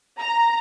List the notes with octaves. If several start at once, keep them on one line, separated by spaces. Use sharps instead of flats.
A#5